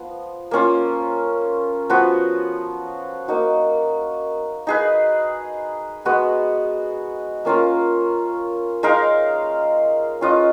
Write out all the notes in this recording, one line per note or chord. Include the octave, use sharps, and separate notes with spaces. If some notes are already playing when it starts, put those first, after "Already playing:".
Already playing: F3 B3
A#3 C#4 F4
F3 B3 F#4 B4
A#3 D#4 F#4
D#4 G#4 B4
G#3 B3 F#4 B4
A#3 C#4 F4 A#4
G#3 D#4 A#4 F5
C#4 F4 B4 D#5